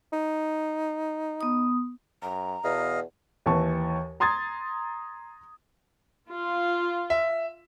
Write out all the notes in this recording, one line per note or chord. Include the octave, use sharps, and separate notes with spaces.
D#4
B3 D#6
F#2 A#5
E2 B2 D#5 F5
D#2 E3 A5 C#6
A#5 C6 D#6 G#6 A6
F4
E5